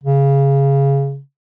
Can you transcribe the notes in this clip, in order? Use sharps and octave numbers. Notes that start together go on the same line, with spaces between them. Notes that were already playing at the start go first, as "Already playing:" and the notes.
C#3